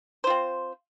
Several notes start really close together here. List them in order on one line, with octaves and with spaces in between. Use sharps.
C5 F4 C4